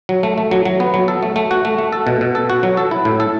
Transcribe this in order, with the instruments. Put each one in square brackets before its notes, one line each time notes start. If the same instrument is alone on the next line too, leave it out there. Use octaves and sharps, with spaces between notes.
[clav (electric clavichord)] F#3
A3
A3
F#3
F#3
B3
F#3
A4
A3
A3
F#4
A3
A3
A4
B2
B2
A4
F#4
F#3
A4
E4
A2
A4